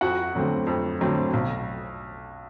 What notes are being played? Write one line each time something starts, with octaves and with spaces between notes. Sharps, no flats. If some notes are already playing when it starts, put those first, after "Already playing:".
F2 F#4 F#5
D3 F#3 A3 C4
F2
D3 F#3 A3 C4
B1